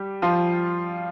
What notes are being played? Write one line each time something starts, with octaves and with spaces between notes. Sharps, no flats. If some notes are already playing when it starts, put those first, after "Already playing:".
Already playing: G3 G4
F3 F4